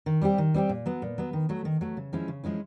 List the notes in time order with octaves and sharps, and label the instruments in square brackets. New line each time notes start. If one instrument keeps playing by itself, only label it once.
[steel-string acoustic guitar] D#3
G3 C4 E4 G4
D#3
G3 C4 E4 G4
A#2
F#3 B3
A#2
F#3 B3
D#3
F#3 A3
D#3
F#3 A3
C#3
F3 G#3 C#4 E4
C#3
F3 G#3 C#4 E4